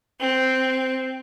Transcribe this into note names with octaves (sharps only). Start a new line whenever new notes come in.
C4